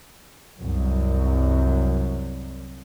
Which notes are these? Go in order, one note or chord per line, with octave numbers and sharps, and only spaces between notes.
C2 F#2